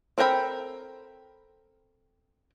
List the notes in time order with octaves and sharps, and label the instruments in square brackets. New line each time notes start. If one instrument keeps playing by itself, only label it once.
[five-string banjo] C4 A4 A#4 G5 B5